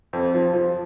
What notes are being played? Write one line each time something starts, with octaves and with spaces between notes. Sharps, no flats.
F2
F3
F3